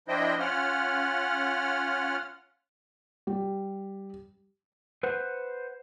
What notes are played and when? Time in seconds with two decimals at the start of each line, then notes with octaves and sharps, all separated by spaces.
0.08 F3 D4 E4 C5 D#5 G5
0.39 C#4 F4 F#5 F6
3.27 G3
5.03 B4 C5 F#5